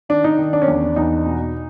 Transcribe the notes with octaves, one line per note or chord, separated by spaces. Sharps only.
D#3 D4
D#4
D#3
D4
C#4
E2 D4
E2 D#4
B2